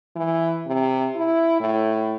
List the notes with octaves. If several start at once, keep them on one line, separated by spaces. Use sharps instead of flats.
E3
C3
E4
A2